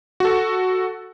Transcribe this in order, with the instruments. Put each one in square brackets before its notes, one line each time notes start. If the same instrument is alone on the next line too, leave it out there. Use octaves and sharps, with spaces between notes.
[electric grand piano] F#4 A4